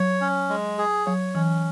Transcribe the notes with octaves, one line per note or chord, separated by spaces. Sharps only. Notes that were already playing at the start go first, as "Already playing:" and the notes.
Already playing: F#3 C#5
C#4
G#3
G#4
F#3 C#5
E3 C#4